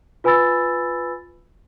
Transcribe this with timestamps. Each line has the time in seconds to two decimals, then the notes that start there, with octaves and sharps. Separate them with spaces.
0.24 F4 B4 G#5 B5 E6 A6